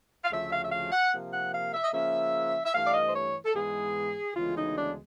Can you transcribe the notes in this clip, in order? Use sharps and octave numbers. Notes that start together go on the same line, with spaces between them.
F5
D2 C#3 F3 A3 E5
F5
E5
F5
F#5
C3 F3 A#3
F#5
F5
E5
D#5
C#3 F3 A#3 C#4 E5
E5
G2 E3 A3 F5
D5
D#5
C5
C#5
A4
G#2 E3 G#3 B3 G#4
D2 C#3 E3 G#3 B3 F4
D#4
D4